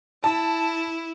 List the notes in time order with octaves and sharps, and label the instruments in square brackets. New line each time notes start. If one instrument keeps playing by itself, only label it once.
[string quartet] E4 [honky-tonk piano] A5